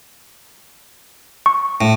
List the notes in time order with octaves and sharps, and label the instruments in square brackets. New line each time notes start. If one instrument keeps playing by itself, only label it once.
[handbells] C#6
[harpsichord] A2